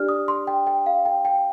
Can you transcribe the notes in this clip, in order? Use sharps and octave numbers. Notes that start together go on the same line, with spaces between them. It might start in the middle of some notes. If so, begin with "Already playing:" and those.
Already playing: D4 G4 D5 F6
D#6
C6
G5
G5
F5
G5
G5